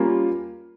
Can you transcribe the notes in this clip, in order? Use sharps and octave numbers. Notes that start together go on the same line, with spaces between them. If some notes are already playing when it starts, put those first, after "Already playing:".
Already playing: G3 A#3 C#4 F4